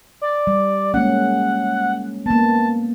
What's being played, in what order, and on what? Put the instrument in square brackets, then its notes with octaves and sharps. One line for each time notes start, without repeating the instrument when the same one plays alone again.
[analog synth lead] D5
[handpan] G3
[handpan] G#3 A#3 C#4 [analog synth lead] F#5
[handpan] A#3 B3 [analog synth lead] A5